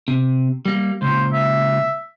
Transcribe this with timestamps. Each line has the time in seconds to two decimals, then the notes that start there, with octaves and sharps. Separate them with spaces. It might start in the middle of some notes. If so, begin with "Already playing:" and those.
0.08 C3
0.66 G3 A#3
1.02 C#2 A#2 C5
1.33 E5